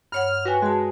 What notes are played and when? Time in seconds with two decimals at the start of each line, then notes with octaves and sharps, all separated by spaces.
0.12 G2 C#5 F#5 F6
0.46 F#4 B4 G5 G#5
0.62 G#3 F#4 A5